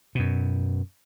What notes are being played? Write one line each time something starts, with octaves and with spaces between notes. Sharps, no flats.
F#2 B2